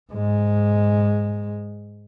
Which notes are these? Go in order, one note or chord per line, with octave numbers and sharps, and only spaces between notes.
G#2 G#3